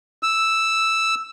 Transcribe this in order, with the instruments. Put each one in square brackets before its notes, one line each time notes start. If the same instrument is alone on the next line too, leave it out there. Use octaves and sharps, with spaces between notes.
[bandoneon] E6